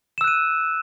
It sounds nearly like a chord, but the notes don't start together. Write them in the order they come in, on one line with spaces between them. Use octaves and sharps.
E7 E6 F#6 D#7